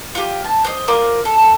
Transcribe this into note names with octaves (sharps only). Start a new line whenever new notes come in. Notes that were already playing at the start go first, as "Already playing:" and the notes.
F4 G4
A5
C5 D#5
F4 A#4 C5 D5
A4